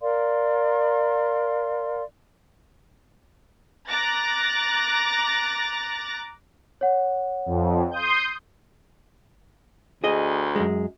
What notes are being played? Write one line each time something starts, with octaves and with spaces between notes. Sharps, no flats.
A#4 D5 F5 C6
A#5 D6 F#6 A6 A#6
C#5 F#5
F2
C6 D#6 G6
D2 G#4 D#5
F#2 G#3